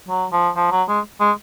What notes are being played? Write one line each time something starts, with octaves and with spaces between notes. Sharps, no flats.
F#3
F3
F3
F#3
G#3
G#3